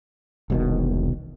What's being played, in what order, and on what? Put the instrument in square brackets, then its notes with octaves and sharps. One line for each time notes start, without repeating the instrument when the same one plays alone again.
[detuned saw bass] E1 [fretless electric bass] C2 B2 D#3